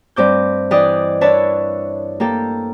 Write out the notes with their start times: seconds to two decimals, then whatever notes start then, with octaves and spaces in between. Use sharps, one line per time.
0.16 G2 C4 D6 G6
0.71 E3 D4 G4 D5 D#5
1.21 D4 E4 B4 C#5 E5 A5
2.20 A#3 G4 A4